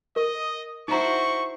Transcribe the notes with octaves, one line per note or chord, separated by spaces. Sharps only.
A#4 D#5
D#4 E4 F#4 C5 A#5 C#6